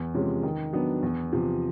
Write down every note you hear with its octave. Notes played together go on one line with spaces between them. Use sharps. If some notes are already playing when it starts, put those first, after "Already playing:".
Already playing: E2
C3 F3 G#3 C#4
D#3
F#3 B3 D4
E2
C3 F3